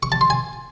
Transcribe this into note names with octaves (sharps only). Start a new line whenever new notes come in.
C#6
A5
C6
G#5